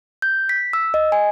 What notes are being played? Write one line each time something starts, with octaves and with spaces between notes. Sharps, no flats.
G6
B6
E6
D#5
G#5